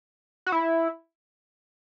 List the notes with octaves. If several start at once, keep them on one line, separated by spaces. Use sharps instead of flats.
F#4
E4